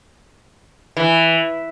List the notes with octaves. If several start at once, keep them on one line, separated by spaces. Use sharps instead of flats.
E3